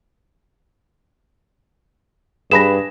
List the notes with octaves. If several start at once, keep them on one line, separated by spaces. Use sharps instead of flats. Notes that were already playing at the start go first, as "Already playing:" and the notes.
G2 G#4 B4 B5 A#6 E7